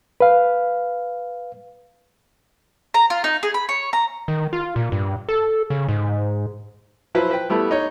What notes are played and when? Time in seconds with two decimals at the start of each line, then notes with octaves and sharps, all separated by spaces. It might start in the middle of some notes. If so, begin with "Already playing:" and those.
0.20 B4 F5
2.94 A#5
3.10 F4
3.24 D#4
3.43 G#4
3.54 B5
3.69 C#5
3.93 A#5
4.28 D#3
4.53 F4
4.76 A#2
4.92 G2
5.29 A4
5.70 C#3
5.89 G#2
7.15 F3 F#3 E4 B4 C5
7.31 B4 G5
7.50 G3 A3 B3 E4
7.71 D#4 C#5